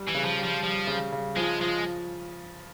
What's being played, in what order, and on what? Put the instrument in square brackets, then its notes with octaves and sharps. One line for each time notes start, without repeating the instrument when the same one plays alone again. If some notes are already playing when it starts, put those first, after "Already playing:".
Already playing: [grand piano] G3
[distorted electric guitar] E3
[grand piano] C#3
[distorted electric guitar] F3
[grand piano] G3
[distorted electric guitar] F3
[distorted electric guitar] F3 [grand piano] G3
[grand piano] C#3
C#3
[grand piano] F3 [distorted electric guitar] G#3
[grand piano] F3 [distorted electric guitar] G#3